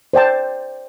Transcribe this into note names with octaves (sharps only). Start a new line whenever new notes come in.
C5 D5 G5 A5